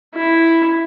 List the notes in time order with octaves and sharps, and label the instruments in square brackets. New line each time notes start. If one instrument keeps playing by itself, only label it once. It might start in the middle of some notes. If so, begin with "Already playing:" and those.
[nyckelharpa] E4